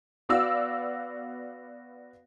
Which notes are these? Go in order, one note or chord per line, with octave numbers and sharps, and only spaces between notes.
B3 F#4 D5 F5 E6